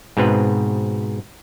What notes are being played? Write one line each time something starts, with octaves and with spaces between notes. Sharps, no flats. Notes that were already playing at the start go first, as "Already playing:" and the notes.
G#2 B2 C4 B4